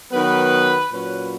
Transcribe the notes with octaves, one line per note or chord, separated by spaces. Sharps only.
D#3 F#3 B3 B4
A#2 F#3 C#4 B4